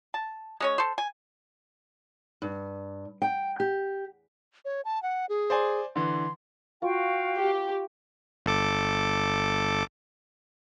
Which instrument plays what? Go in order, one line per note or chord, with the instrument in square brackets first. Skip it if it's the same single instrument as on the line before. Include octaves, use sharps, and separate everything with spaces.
[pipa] A5
G#3 C#4 C#5
A4 C5
G#5
[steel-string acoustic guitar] G2
G5
G4
[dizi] C#5
A5
F#5
G#4
[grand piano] C5 D5 G#5
[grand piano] D3 E3 [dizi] C6
[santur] F4 C#6 [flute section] F#4 F5 G5
[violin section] G4
[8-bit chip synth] G1 A4 D6